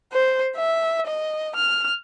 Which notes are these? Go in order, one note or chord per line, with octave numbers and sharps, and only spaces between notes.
C5
E5
D#5
F6